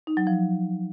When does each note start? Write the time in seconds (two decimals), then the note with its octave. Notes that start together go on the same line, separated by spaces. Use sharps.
0.07 D#4
0.17 F#3
0.27 F3